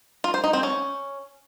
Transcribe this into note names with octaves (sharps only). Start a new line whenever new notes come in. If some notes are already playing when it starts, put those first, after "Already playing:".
F4
C5
D#4
C4
C#4